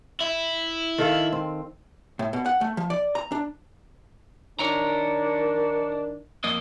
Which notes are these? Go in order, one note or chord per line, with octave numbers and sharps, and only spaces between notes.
E4
D#3 A4 F5
C4
A2
B2
F#5
A3
F3
D5
A#5
D4
D#3 D4 A#4 C#5 A#5
F2 A#3 D#5